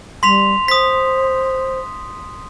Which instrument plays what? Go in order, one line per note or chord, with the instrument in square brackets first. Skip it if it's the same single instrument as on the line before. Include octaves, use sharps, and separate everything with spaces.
[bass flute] G3 [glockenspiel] C6 B6 F7
[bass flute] C5 [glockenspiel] D#6 B6